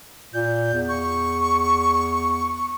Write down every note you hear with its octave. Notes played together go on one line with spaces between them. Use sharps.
A#2 G6
E2
C#6